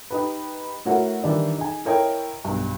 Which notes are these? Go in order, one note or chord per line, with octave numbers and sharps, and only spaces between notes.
D#4 G4 B4
A3 E4 F#4 A#4 C#5 F#5
D#3 E3 G3 D4 E4
D#4 G#4 G#5
E4 A#4 C#5 D#5 G5
B1 G2